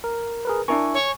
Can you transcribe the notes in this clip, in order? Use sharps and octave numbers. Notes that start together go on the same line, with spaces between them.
A#4
G#4 A#4 B4
D4 E4 A#4 G#5 C#6
C#5